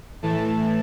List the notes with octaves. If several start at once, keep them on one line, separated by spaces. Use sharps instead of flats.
A2 E3 A3 A5